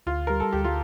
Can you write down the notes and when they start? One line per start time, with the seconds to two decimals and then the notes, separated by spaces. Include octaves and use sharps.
0.07 D2 F4
0.27 G3 A#4
0.40 A4
0.53 D2 G4
0.64 F4